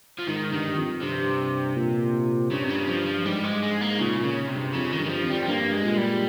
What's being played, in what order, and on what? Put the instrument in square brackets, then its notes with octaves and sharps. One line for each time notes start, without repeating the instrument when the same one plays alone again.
[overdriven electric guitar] F3
[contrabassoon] G#2 [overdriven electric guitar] D#3
[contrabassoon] G2 [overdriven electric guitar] D#3
[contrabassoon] F2
[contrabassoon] G2 [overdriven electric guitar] C3
[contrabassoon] A#2
[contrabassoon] G2 [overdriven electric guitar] C#3
[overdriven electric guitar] C3
C#3
F3
F3
[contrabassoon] G#2 [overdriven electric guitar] G3
[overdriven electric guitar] G#3
G#3
A#3
[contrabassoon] A#2 [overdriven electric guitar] C#3
[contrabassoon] A#2
[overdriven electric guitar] C#3
C3
[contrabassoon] G2
[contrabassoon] F2 [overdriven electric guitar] C#3
[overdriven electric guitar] D#3
[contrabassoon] G2
[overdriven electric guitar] D#3
F3
[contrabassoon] F2
[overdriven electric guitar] G3
C4
[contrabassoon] G2 [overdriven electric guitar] A#3
[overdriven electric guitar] G#3
[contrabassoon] A#2
[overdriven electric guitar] G3